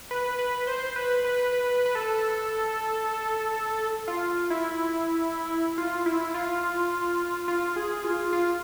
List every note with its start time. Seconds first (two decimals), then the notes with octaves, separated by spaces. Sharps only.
0.11 B4
0.39 B4
0.67 C5
0.96 B4
1.24 B4
1.52 B4
1.86 B4
1.95 A4
4.08 F4
4.50 E4
5.78 F4
6.06 E4
6.34 F4
7.48 F4
7.76 G#4
8.04 F4
8.33 F4